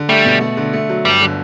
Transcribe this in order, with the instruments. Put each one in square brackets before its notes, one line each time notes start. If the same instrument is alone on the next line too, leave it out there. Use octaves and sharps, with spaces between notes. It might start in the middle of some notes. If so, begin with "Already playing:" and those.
Already playing: [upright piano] D3
[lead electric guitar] G3 [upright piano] A3
[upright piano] B2
A3
D3
A3
F#3
[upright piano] G1 [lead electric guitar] G3
[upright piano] D3